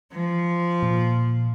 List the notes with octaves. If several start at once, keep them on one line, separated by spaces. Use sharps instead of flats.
F3
A#2